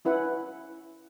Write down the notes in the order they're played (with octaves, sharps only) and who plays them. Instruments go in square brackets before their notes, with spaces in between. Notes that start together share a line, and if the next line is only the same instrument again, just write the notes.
[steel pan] C#4 E4 B4 F#5